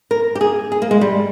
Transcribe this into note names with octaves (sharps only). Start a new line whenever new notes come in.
A#4
G4
G#4
G#4
A#3
G#3
G3